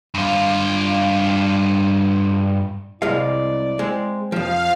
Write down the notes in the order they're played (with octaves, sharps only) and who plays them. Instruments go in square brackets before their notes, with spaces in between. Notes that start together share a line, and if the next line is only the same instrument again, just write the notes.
[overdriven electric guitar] G2 F4
[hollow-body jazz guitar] C2 F5 [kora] G#3 [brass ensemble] E4 D5
[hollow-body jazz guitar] G#3 [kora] C4
[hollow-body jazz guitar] F2 F3 [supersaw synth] F5